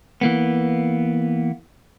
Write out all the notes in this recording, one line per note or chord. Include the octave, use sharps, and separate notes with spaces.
E3 A#3 B3